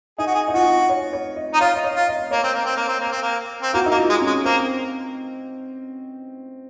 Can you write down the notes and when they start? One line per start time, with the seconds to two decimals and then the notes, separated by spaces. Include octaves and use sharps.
0.18 D#4 G#4
0.27 F#4
0.34 G#4
0.48 D#4
0.54 F4 F#4
0.89 C#5
1.13 C#5
1.36 D#5
1.54 D#4
1.60 F4 C#5
1.75 D#5
1.84 C#5
1.95 F4
2.08 D#5
2.31 A#3 C#5
2.43 C4
2.54 A#3
2.65 C4
2.77 A#3
2.88 C4
3.00 A#3
3.12 C4
3.22 A#3
3.62 C4
3.74 A#3 F#4
3.86 A#3 D#4
3.97 F4
4.09 G#3
4.21 C#4
4.27 G#3
4.44 A#3 C4